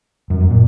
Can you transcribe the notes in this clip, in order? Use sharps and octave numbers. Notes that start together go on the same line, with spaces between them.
F#2
F#2
A#2